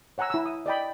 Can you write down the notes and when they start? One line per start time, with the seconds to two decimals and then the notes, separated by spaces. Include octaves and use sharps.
0.18 C#5 F#5 G#5 A#5 E6
0.30 E4 E6
0.46 D#6
0.66 D5 D#5 G5 B5